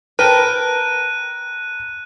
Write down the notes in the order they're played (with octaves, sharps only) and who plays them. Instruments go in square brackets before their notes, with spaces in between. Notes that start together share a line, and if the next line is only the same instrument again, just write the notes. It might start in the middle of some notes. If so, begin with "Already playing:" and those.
[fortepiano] A#4 G5 A5 [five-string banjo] B4 [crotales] F#6 D#7